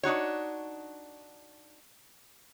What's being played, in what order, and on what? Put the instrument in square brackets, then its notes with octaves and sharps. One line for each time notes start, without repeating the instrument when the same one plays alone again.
[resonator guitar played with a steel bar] D4 D#4 F#4 C#5